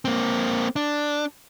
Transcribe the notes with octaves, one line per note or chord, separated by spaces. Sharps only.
A#3 C4
D4